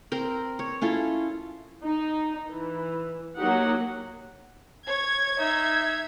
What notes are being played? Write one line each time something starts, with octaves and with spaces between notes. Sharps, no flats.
C4 A#4
C#5
C#4 E4 F4 A4
D#4
E3
F#3 A#3 D#4 F#4 G4 F#5
C#5 G#6
D#4 E5